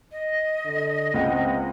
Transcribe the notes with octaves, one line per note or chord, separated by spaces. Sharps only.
D#5
D3
C#2 C4 F#5 G5